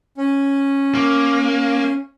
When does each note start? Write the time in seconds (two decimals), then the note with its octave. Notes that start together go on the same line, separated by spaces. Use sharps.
0.17 C#4
0.95 A#3